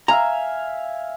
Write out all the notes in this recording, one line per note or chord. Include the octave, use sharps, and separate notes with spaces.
E5 F5 G#5 A#5